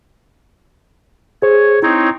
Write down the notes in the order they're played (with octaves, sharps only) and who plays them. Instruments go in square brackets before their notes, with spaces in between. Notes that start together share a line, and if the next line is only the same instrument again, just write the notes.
[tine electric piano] G#4 C5 [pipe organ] C#5
[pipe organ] C4 D#4 C#5 [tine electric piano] E4